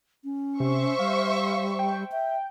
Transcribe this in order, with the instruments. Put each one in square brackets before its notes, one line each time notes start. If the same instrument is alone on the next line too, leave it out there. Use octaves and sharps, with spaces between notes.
[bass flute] C#4
[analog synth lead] C3 [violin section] C5 E5 C#6
[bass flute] G3 [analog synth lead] F5
[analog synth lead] G5
[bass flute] E5